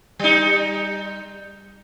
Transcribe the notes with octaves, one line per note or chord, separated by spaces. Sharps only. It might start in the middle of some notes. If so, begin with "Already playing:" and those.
G3 D#4